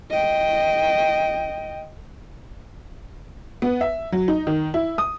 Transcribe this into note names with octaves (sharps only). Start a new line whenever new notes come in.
D#5 G5
B3
E5
F#3
D#4
D#3
E4
D#6